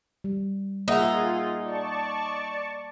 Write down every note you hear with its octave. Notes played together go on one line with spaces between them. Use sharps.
G3
A#3 D#4 F4 G#4 E5 F#5
D5 A5 C#6